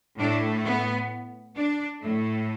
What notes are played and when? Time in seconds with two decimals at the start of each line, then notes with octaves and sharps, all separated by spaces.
0.18 A2 A3 D4
0.65 B3
1.56 D4
2.00 A2 A3